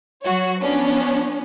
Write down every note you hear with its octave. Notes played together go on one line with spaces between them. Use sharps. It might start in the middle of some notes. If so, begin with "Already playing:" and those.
F#3 F#4 C#5
F3 B3 C#4 D4